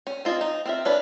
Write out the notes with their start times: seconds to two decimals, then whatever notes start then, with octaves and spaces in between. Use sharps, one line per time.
0.07 C#4
0.25 C4 F4 D#5 G#5
0.41 D#4
0.65 C4 F4 E5
0.85 C#4 D4 B4